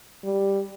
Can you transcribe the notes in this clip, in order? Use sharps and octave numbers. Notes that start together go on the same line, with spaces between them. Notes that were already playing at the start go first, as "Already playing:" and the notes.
G3